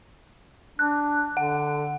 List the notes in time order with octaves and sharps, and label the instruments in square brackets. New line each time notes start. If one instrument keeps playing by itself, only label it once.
[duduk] D4 [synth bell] F#6
[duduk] D3 [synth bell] F#5